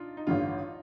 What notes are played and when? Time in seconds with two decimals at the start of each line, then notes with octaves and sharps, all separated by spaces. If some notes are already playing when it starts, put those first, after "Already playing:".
Already playing: D4 D#4 F4
0.17 D#4
0.27 A1 G2 D3 F4